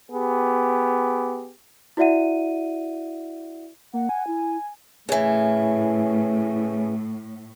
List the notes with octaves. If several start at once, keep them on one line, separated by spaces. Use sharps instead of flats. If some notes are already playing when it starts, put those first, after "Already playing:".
B3 G4 G#4
E4 F#4 D5 E5 F#5 D#7
A#3 F#5
G#5
E4
A2 C#3 E3